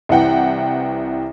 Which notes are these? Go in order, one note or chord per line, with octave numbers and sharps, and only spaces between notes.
C2 E3 F#5 G5